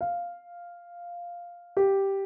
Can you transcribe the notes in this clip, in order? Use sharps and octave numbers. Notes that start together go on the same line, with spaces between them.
F5
G4